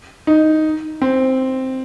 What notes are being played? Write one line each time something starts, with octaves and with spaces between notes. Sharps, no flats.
D#4
C4